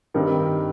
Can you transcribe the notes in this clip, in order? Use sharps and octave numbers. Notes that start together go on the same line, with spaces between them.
G2 D#3 G3 C4